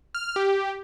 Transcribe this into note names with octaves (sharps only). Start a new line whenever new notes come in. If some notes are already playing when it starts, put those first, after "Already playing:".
F6
G4